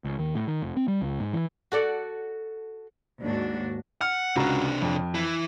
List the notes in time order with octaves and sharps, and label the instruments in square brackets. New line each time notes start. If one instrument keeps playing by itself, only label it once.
[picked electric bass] C#2
D#2
A2
D#3
F1
C4
G3
C#2
G#2
E3
[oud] F#4 A4 D5
[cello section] D#2 G#2 D4 F#4
[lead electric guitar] F#5 [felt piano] F6
[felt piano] C#2 F#4 A#5 [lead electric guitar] C3 D4
[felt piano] F2
[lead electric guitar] E3 E4